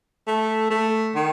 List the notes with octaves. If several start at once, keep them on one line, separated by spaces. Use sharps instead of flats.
A3
A3
D#3